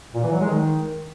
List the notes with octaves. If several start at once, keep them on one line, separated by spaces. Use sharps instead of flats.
A#2
E3
F#3
G#3
D#3